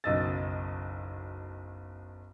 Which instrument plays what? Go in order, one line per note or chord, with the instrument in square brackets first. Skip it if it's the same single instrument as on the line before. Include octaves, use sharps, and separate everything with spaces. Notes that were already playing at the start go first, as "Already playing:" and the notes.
[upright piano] F#1 B1 D#5 E6 A6